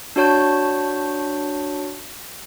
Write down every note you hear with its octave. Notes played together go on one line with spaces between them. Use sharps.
D4 F#4 C#5 A5 G6